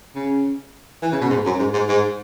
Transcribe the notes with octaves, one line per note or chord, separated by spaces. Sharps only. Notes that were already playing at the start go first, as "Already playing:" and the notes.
C#3
E3
C#3
B2
G#2
F#2
G#2
G#2
G#2